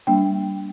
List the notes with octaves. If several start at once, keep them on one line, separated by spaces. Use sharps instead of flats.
G3 A#3 D4 G5